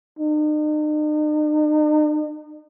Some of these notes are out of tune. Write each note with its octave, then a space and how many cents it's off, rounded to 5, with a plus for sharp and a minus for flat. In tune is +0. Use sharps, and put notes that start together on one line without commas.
D#4 -45